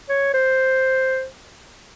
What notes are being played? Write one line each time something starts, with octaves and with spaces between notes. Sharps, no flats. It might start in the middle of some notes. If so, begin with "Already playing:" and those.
C#5
C5